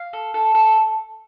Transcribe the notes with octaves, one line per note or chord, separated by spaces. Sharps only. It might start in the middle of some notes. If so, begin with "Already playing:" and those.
Already playing: F5
A4
A4
A4